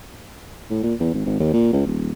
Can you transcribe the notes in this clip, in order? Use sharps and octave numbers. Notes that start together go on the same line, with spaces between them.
A2
A#2
E2
G#1
G#1
D#2
A#2
C#2
D#1